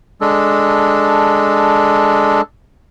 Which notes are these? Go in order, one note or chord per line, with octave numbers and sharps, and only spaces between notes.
G#3 D4 A4